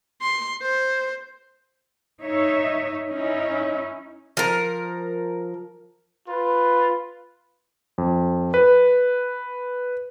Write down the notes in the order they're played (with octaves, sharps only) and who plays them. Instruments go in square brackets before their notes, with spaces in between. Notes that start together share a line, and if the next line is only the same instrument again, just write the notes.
[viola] C6
C5
[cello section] D#4 C#5 E5
C#4 D#4 E4
[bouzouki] F3 A#4
[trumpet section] F4 B4
[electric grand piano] F2
B4